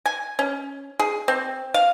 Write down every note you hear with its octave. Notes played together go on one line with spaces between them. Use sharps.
G#5
C#4
G#4
C4
F5